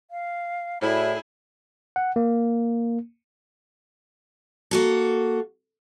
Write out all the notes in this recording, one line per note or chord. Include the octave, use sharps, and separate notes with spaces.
F5
A2 E4 F#4 G#4 D5 E5 B5
F#5
A#3
A#3 F#4 A4